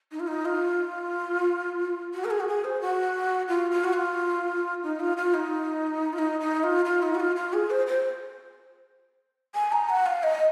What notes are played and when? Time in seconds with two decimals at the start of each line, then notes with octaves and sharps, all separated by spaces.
0.11 D#4
0.20 F4
0.27 D#4
0.45 F4
2.14 F#4
2.25 A#4
2.30 G#4
2.40 F#4
2.48 G#4
2.64 C5
2.81 F#4
3.48 F4
3.71 F4
3.84 F#4
3.93 F4
4.83 D#4
5.00 F4
5.17 F4
5.34 D#4
6.13 F4
6.18 D#4
6.40 D#4
6.63 F4
6.85 F4
7.03 D#4
7.15 F#4
7.20 F4
7.36 F4
7.53 G#4
7.70 C5
7.87 C5
9.55 G#5
9.72 A#5
9.89 F#5
10.06 F5
10.23 D#5